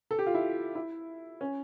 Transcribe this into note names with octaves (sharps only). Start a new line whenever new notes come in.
A4
G4
F4
E4
E4
C#4